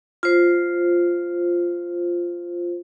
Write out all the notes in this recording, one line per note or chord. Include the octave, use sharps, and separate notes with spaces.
F4 C5